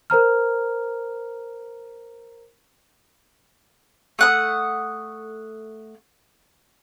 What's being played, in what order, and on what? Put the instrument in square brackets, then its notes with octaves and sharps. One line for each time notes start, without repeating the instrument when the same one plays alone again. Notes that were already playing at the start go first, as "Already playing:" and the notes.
[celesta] A#4 C5 A#5 F6
[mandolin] A3 F#5 D#6